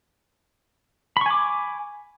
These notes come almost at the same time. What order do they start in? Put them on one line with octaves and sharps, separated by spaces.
B5 C#6 G#5 D6